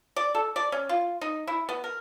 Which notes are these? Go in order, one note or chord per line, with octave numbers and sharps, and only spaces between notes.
D5
A4
D5
C#4
F4
D#4
E4
B3
A#4